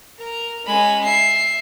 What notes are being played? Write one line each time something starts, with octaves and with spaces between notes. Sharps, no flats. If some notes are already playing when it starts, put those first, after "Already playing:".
A#4
G#3 C#4 B5
E5 C7